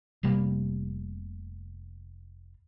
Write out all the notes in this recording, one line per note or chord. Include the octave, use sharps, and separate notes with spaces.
F1 C3 G3 A#3